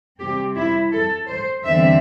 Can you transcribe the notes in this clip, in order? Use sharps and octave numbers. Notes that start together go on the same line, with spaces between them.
C3 G3 C4 G4
E4
A4
C5
E2 D3 G3 C4 E5